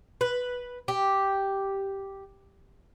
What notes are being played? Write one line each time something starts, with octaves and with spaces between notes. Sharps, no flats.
B4
G4